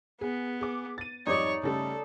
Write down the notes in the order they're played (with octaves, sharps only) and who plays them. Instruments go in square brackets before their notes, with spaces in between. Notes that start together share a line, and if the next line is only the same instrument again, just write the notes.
[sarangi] B3 [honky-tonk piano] G#4
[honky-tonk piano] G#4 D6
A6 D#7
[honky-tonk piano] F2 G#2 G3 [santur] D#4 D5 [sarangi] C#5
[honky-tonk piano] C#3 G3 A3 [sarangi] A4